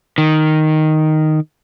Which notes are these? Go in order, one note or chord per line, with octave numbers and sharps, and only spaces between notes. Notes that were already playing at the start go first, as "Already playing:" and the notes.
D#3